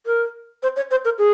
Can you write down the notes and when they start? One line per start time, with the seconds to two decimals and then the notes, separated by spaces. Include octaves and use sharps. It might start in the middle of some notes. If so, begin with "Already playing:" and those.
0.06 A#4
0.62 C5
0.76 C#5
0.90 C5
1.05 A#4
1.18 G#4